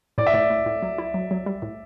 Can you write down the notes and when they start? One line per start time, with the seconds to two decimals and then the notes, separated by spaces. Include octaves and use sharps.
0.18 A2 D5
0.26 E5
0.34 A2 D5
0.50 A2
0.66 A2
0.82 F#3
0.98 E4
1.14 F#3
1.31 F#3
1.46 G3
1.62 A2